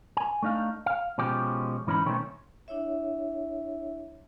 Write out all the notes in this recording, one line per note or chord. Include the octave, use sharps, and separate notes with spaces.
G#5
A3 D4 D#4 F5
F5
B2 F3 G#3 C#4 G4
G#2 E3 C#4 D#4 B5
B1 D#3 A3 C4 C#4 C#5
D4 E4 C#5 E5